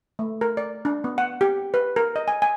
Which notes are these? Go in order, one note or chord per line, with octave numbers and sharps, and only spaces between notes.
A3
A#4
D5
D4
B3
F#5
G4
B4
A#4
D#5
G#5
G#5